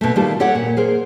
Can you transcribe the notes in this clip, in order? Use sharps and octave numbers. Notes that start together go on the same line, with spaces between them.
B2 A3
D#3 G3 A3 F4 G4 A4
G4 A4 C#5 F#5
A#2
G#4 A#4 C5